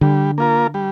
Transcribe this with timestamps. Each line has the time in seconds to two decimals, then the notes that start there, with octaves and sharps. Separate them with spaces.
0.01 D3 G3
0.38 A#3 F4 A#4
0.74 G3